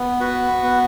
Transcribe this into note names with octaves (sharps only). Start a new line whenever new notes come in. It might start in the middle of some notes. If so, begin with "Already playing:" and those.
Already playing: B3
F#4 B4
B3